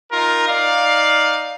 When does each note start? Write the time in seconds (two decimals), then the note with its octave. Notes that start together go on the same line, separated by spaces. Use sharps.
0.12 D#4 F4 A#4
0.49 D#4 D5 F5